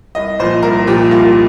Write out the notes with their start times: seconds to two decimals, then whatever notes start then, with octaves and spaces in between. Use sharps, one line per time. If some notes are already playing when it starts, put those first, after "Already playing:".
0.15 C2 D#5
0.39 A#2 F3 C5
0.63 C2 A#4
0.87 A#2 F3 G4
1.11 C2 F4